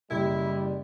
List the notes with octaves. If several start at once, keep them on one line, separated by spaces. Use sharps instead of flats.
F#1 G3 E4 G4